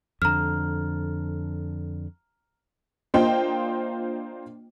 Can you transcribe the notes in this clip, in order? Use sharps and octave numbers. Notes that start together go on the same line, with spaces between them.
F2 D3 A#5 F6
A#3 D4 F4 C5 D#5 G5